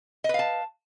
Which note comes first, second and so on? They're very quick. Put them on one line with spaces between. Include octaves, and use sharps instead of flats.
D#5 B4 F5 A5